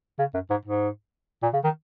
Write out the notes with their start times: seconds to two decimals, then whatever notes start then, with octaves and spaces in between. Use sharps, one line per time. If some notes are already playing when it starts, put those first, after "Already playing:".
0.19 C#3
0.34 F#2
0.50 G#2
0.65 G#2
1.43 A#2
1.53 C#3
1.64 D#3